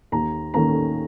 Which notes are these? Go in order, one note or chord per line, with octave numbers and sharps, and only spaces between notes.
D#2 A#5
D#3 A#3 C#4 A#5